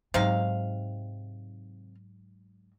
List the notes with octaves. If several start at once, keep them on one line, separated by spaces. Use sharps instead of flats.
G#2 C3 F#3 D#4 F5